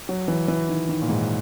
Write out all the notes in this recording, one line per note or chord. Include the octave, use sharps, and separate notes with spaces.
F#3
E3
E3
D#3
D#3
A#2
G#2